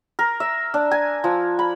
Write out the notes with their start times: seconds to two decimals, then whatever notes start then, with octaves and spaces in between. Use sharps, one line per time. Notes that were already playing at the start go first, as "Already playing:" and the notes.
0.19 A#4
0.40 E5
0.74 D4
0.91 G#5
1.24 F3
1.59 B5